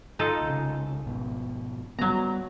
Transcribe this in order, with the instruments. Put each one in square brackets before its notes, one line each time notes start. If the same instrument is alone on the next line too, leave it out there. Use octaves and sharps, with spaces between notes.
[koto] D#4 F4 A4
[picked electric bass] C2 C#3
G#1 B2
[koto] F#3 A#5 [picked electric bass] G3 B3